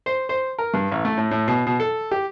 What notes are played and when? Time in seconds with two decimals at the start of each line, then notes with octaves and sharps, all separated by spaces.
0.06 C5
0.29 C5
0.58 A#4
0.74 G2
0.92 A1
1.05 A3
1.17 A2
1.31 A2
1.48 B2
1.67 B2
1.80 A4
2.11 G4